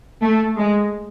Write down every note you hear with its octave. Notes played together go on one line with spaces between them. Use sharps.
A3
G#3